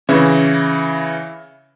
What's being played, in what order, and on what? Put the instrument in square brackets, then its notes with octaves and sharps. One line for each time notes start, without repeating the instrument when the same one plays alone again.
[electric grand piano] C#3 E3 E4 [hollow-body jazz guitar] C#4 E5